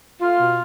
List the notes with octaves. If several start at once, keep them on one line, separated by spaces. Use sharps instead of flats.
A3 F4
B2